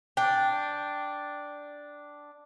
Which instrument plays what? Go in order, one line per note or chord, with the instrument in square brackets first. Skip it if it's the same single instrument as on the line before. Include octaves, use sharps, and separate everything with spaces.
[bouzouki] D4 G5